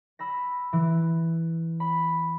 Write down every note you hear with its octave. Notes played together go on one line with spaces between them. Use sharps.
B5 E6 A#6
E3
B5